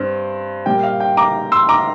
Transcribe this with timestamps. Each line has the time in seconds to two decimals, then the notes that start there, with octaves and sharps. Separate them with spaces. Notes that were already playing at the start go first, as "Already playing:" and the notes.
Already playing: G2 C4
0.66 A#2 G3 A#3 G5
0.83 F5
1.00 G5
1.17 A#5 D6
1.52 C6 E6
1.69 A#5 D6